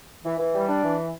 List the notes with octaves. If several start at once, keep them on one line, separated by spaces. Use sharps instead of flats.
E3
E3
G3
D4
E3